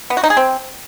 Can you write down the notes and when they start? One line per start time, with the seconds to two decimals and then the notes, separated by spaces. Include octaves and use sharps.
0.10 B3
0.17 F#4
0.24 D#4
0.30 G#4
0.37 C4